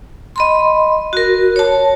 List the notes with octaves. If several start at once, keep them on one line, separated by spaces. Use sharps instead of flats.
D#5 B5 C6
F#4 A#4
C#5 A5